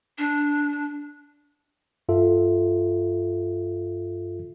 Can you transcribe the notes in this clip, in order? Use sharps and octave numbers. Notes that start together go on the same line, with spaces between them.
D4
G2 F4 A4 E5